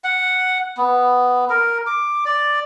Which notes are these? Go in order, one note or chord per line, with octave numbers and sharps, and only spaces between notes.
F#5
B3
A#4
D6
D5